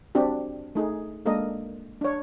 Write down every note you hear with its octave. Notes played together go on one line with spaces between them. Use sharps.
C4 D4 F#4 G4
A3 D#4 G#4
G#3 A#3 D4 A4 A#4 D#5
D4 C#5